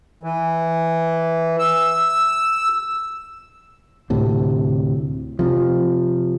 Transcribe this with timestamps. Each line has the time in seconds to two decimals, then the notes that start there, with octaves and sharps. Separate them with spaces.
0.23 E3
1.59 E6
4.10 D2 A2 C3
5.39 C3 F3